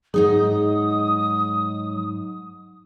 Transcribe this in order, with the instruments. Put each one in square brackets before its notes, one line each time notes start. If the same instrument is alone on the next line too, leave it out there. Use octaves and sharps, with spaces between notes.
[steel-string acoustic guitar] G#2 D#4 D#5 [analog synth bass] F#3 [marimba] G#4 [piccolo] D#6